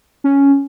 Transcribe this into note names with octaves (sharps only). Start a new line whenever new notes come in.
C#4